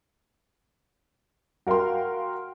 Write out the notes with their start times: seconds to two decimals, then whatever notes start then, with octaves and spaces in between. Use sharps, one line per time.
1.67 F#4 A#4 F5 G5 C6